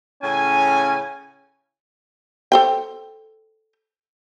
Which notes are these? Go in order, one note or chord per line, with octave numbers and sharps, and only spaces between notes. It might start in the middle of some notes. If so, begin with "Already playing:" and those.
A2 C#3 C#4 G#5
A4 C5 G5